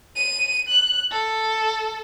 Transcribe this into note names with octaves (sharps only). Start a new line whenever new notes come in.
D#7
F#6
A4